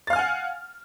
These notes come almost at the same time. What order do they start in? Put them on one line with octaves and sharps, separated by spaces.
A6 F5 F6 G#5 F#5